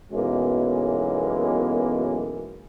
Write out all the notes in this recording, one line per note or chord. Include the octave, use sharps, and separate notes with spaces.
B1 F#2 B2 E3 G#3 A#3